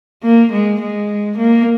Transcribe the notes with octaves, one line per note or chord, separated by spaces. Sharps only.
A#3
G#3
G#3
A#3